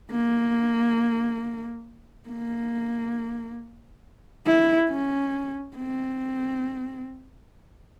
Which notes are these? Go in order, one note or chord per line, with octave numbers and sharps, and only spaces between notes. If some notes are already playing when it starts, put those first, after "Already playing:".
A#3
A#3
E4
C#4
C4